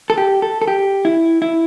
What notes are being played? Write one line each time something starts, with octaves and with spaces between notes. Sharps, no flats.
A4
G4
A4
A4
G4
E4
E4